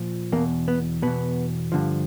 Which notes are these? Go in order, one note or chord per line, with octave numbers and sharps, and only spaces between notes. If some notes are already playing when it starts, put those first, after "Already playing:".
Already playing: A#2 F3
E2 B2 A#3
B3
E2 B2 B3
G2 D3 F3